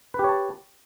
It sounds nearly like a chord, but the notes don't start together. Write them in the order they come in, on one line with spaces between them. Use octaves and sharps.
B4 G4 C#5 A5